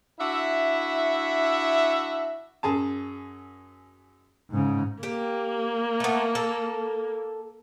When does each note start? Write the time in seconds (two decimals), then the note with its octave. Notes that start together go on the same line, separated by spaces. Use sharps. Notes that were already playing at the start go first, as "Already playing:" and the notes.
0.20 D4 E4 F#4 E5
2.63 F#2 G#4 A5
4.50 G#2 C#3
5.03 A#3 G4
6.00 A3 B3
6.35 A4